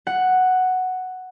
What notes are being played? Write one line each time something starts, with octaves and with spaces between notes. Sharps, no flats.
F#5